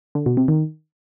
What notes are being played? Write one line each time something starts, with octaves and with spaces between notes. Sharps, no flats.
D3
B2
C3
D#3